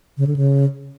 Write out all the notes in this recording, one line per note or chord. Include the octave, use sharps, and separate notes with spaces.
C#3
D3
C#3